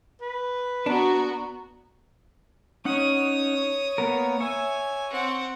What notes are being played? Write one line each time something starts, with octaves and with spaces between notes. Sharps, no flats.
B4
B3 D4 F#4 A#5
C#4 D#4 C#5 F#5 D#6
A#3 B3 A#4
C#5 E5 G#5
C4 F#5